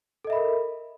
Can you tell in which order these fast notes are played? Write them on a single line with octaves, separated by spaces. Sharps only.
A4 D#5 E5 B5 A#4